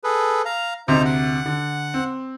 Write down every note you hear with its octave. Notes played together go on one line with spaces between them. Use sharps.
G#4 A4 B4
F5 A#5
D2 C3 D#4 C5 A#5
F#5
D3
C4